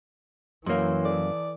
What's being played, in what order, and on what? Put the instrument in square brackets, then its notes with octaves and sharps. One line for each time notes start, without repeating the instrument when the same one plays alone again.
[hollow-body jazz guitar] F#2 A#3 [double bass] E3 [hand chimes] C#5 C6
[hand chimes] A4 [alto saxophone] D5